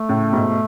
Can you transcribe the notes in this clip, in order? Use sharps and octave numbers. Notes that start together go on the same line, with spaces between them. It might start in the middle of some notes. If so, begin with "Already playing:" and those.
Already playing: A3
A2 C#3
G#2 B2